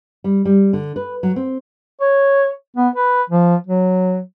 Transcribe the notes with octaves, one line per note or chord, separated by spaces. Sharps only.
G3
G3
D3
B4
F#3
C4
C#5
B3
B4
F3
F#3